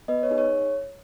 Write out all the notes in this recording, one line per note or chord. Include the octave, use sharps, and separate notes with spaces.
B3 B4 D#5
C#5
D#4 G#4
C#5